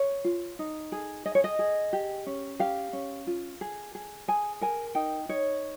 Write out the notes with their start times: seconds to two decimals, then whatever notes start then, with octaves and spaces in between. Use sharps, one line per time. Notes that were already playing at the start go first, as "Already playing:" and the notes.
Already playing: C#5
0.24 F4
0.59 D#4
0.92 G#4
1.26 G#4 D#5
1.35 C#5
1.44 D#5
1.59 G#4
1.93 G4
2.26 C#4
2.60 G4 F5
2.93 C#4
3.27 F4
3.61 G#4
3.95 G#4
4.28 G#4 G#5
4.61 A#4 G#5
4.95 D#4 G5
5.29 D#4 C#5